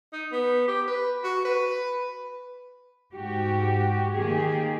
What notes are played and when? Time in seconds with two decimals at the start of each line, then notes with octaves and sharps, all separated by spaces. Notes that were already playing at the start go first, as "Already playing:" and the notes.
0.13 D#4
0.32 B3
0.68 G4
0.87 B4
1.24 F#4
1.45 B4
3.14 G#2 F#4 G4
4.13 D#3 A#3 G4 G#4